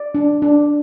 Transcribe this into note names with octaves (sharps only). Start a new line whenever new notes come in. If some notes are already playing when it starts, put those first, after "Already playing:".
Already playing: D5
D4
D4